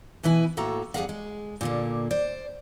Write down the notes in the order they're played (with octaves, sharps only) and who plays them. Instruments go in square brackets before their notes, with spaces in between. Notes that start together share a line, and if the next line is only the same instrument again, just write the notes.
[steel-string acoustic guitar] B2 E3 E4 B4 G#5
A2 A#3 F#4 A4 A#5
F2 G3 G#4 A#4 F5 F#5
G#3
A#2 D3 A#3
C5 D5